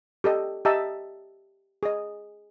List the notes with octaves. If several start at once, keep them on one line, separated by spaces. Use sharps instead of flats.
G4 A4 D#5
G4 D#5 E5 A5 A#5 E6
G#4 D#5